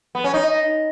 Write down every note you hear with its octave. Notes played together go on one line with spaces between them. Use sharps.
B3
C#4
D#4